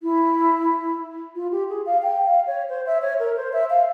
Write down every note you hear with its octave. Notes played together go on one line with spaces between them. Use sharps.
E4
F4
G4
G#4
F5
G5
F5
C#5
C5
E5
C#5
A#4
C5
E5
F5